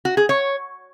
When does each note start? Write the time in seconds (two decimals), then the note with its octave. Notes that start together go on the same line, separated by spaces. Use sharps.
0.05 F#4
0.17 G#4
0.29 C#5